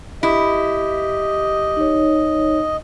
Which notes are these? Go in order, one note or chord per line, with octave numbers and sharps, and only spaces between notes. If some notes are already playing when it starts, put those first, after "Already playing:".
E4 G4 D#5
D#4 C#5